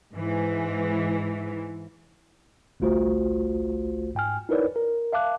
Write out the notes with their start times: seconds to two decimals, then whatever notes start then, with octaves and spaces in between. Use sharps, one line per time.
0.14 G#2 E3
2.80 G1 C2 A3 F4 F#4 C5
4.15 G#2 G5 G#5 F6
4.49 D#4 E4 A#4 B4 C#5 D5
4.76 A#4
5.13 E5 F5 A5 D6 F#6